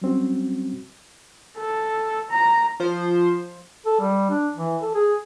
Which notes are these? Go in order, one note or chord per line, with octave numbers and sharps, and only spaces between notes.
F#3 G3 C4 C#4 F#4
A4
A#5
F3 C5
A4
G3
D4
E3
A4
G#4